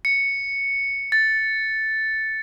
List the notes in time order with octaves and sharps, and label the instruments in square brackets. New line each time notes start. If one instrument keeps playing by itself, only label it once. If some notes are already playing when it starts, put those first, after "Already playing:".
[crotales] C#7
A6